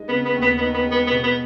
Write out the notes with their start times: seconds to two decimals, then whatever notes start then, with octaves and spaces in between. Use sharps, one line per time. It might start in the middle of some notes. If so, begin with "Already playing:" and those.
Already playing: G#3 D#4
0.08 C#3 B3
0.25 B3
0.35 D#2
0.42 B3
0.57 B3 D#4
0.74 B3
0.86 G#3
0.91 B3
1.07 B3
1.11 B2
1.23 B3